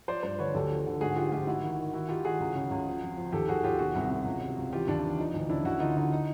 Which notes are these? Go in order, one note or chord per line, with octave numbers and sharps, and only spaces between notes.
F3 C5 D5
G2 C5 D5
D3 B4 C#5
D2 G4 A4
F3
D3
G#2 F#4 G#4
F3 F4 G4
G#2 F4 G4
G#2 E4 F#4
D#3
D#3
D#3 E4 F#4
D#3 F4 G4
D#3 F#4 G#4
C#2
C#3
C#2
F3
F2
F3
D#2 G4 A4
D#2 F#4 G#4
D#2 F4 G4
B2 F#4 G#4
C2
B2
C#2
C3
C#2
E3 F4 G4
D#2 D4 E4
E3
F3 D#4
D2
C#3 D4 E4
D2 E4 F#4
D3 D#4 F4
D3 D#4
D#4